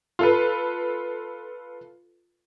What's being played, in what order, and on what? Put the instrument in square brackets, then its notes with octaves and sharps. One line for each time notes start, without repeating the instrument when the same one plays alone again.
[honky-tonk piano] F4 A4 B4